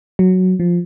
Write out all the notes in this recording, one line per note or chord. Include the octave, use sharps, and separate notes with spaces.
F#3
F3